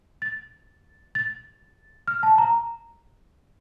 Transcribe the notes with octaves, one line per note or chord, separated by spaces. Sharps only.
A6
A6
F6
A5
A#5